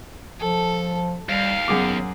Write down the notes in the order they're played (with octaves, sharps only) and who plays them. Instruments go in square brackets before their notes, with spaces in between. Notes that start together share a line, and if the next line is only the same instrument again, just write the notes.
[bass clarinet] F3 [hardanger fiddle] A4
[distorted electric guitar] D#2 [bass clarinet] G3 [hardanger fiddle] F5
[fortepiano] F#2 G#4 D6 [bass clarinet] B3